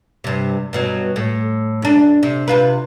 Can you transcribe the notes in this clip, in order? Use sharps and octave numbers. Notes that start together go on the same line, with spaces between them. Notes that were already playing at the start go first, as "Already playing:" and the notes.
G2 C3
G2 B2 F#3
A2
F#2 D4
C3
C3 F4 B4